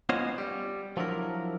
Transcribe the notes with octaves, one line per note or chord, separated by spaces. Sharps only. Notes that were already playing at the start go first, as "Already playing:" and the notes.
B3 C#4 F4 C5 C#5 D#5
G3
F3 F#3 D4 E4 A#4